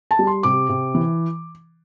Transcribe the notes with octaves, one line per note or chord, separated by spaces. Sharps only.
A5
G3
C6
C3 D6
C3
E3